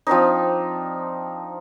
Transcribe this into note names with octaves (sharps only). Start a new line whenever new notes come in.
F3 C4 D4 D#4